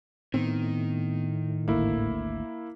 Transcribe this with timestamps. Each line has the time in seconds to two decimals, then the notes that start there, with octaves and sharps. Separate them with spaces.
0.34 A2 D#3 B3 C4
1.68 G#1 D2 A3 A#3 E4